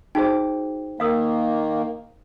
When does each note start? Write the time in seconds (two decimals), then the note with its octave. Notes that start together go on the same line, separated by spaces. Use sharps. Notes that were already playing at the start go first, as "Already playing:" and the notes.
0.15 D#4 F#4 G#4 C5 G5
1.00 D#3 A#3 F5 D#6 E6